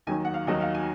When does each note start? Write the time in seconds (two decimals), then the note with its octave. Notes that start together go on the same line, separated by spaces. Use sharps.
0.07 D#2 D#3 F#3 G#5
0.25 F#5
0.34 F5
0.47 D#2 D#3 F#3 D#5
0.61 F5
0.74 G#5